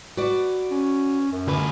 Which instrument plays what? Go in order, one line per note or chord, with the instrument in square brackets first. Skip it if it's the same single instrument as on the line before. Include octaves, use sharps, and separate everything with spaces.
[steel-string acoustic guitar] F#4 B4 D5
[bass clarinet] C#4
F#2
[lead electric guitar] D2 B4